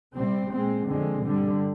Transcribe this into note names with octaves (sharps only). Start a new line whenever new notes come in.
C3 G3 C4
A#2 G#3 C4
F2 D3 G#3 C4
G2 D3 G3